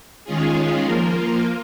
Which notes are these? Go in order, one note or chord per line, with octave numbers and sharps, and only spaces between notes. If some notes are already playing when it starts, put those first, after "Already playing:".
D#3 G#3 C#4 F4 G#4
F3 A#3 F4 A#4